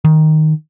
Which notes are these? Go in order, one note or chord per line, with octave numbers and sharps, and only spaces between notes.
D#3